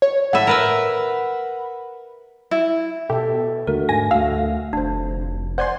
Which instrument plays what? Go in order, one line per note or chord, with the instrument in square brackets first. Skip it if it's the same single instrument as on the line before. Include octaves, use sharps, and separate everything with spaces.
[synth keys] C#5
[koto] A2 E5 [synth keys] F#5 B5
[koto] A#4 B4 E5
[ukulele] E4
[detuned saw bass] B2 [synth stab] G4 [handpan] A4 E5
[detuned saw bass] D#2 [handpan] D3 A3 F#4 [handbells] A#4
[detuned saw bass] G#2 [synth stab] G#5 A#6
[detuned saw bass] D2 [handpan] A3 F#4 [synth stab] F5 [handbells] E6
[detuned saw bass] F1 [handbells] D4 C5
[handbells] C5 D5 G#6 [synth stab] F#5 G#5 C6